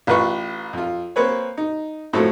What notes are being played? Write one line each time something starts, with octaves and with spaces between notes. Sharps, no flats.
A1 F4 B4 C#6
F2 F4
A#3 C4 B4 C#5
D#4
F2 A2 F#3 C4 A4